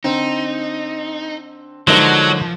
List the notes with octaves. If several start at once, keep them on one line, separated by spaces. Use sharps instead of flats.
D3 C4 D#4
D3 F3 F#3 G#3 D4 D#4 A#4 C5